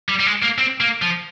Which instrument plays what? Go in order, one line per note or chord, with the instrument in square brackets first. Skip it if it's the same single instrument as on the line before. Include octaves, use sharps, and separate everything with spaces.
[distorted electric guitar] G3
G3
G#3
A#3
C4
A#3
F3